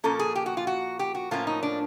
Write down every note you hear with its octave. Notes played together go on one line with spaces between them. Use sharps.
A#2 F3 A#3 C#4 A4
G#4
G4
F#4
F4
F#4
G4
F#4
A2 F3 A#3 C#4 F4
D#4
D4